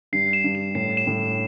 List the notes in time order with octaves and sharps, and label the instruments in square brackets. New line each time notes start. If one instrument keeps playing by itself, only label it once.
[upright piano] G2 [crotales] C7
[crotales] E7
[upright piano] G2
[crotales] E7
[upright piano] A2 [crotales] C7
[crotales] E7
[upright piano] A2